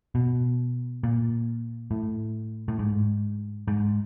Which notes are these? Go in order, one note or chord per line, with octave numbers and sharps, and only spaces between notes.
B2
A#2
A2
A2
G#2
G#2